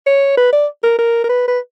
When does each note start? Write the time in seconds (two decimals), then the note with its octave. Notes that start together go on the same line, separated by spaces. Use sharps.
0.06 C#5
0.37 B4
0.53 D5
0.83 A#4
0.99 A#4
1.24 A#4
1.29 B4
1.48 B4